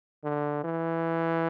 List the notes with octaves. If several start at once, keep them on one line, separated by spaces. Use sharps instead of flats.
D3
E3